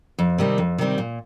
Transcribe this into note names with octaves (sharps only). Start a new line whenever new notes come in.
F2
C3 D#3 G3 C4
F2
C3 D#3 G3 C4
A#2